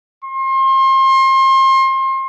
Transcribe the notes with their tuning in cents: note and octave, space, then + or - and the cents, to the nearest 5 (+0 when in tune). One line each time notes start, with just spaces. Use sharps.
C6 +35